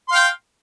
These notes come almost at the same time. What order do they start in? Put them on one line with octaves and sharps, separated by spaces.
C6 F5 G5